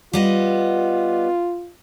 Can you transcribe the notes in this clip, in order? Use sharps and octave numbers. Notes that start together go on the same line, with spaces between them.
G3 B3 F4 D#5